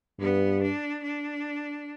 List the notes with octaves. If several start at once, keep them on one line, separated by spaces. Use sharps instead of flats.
G2 B3
D4
D4